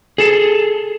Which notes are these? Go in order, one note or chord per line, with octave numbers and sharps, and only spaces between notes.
G#4 A4